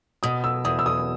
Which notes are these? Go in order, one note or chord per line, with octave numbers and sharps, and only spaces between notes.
B2 D#6
E6
E2 D#6
E6
D#6